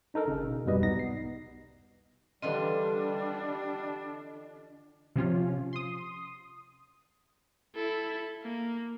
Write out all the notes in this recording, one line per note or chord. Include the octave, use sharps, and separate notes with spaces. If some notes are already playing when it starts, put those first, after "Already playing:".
D4 D#4 A4 A#4
G1 C#3
B2
F2 G#2 B2 G3 B4 D#5
C2 B3 D#4 A#6
C7
D3 E3 G3 D4 F4 D#5
C3 F3 C#4 F4
C6 D#6
E4 A4
A#3